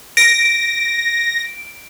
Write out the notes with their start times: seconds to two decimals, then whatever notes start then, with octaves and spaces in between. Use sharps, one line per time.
0.17 A#6 D7